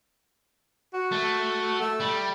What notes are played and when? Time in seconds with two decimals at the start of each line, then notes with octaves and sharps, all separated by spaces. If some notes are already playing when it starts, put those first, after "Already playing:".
0.94 F#4
1.12 A3
1.81 A3
2.00 G3